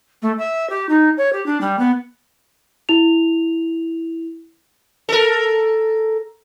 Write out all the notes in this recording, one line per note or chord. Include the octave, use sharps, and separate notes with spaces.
A3
E5
G4
D#4
C#5
G4
D4
G3
B3
E4 F7
A4 A#4